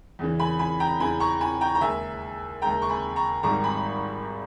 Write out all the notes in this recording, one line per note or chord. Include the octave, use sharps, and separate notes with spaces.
E2 C#3 E3
G#5 B5
G#5 B5
G5 A#5
E2 C#3 E3 G#5 B5
A#5 C#6
G#5 B5
G5 A#5
A#5
D#2 C#3 G#3 E5 G#5
D#2 C#3 G#3 G5 A#5
C#6
G#5 B5
A#5 C#6
G#1 G#2 D#3 G3 A#5 C#6
G#5 B5